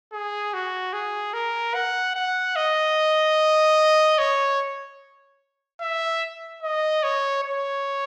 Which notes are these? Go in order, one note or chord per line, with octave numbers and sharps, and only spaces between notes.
G#4
F#4
G#4
A#4
F#5
F#5
D#5
C#5
E5
D#5
C#5
C#5